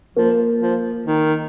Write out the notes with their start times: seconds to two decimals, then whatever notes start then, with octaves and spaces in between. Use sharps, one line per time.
0.16 F3 A#3
0.62 F3
1.07 D#3